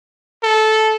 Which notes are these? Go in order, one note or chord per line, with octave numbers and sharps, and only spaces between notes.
A4